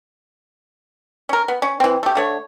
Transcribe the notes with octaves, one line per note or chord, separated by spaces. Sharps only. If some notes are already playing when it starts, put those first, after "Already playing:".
C#4 A#4
B3
C#4
E3 C4
A3 G4
D3 A3 C#5